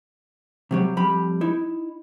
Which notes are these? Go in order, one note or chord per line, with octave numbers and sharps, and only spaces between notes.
C3 F#3 G3
F2 G3 B5
D#4 E4